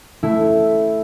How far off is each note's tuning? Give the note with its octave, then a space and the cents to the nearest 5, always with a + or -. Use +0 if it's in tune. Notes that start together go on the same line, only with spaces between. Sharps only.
A3 +0 E4 +0